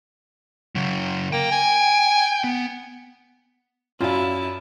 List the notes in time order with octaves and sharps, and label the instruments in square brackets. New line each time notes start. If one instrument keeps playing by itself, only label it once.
[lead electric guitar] C#3 F#3
[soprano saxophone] A#3 [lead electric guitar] G5
[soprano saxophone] G#5
[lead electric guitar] B3
[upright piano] F#2 [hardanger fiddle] E4 A5 [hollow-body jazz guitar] F4 D5 F5